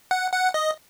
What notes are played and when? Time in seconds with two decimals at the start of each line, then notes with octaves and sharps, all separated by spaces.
0.11 F#5
0.33 F#5
0.54 D#5